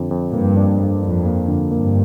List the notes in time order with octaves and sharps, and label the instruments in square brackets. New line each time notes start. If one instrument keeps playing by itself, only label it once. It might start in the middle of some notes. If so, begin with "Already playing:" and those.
Already playing: [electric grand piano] F2 D3
F2
[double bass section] G2 [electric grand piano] A#3
[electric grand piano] D4
A#3
[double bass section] F2 [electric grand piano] D4
[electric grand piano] A#3
D3
[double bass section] G2 [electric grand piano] A#3